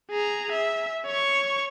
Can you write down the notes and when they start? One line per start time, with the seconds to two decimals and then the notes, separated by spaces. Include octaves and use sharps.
0.11 G#4 A#5
0.52 E5
1.06 C#5 C#6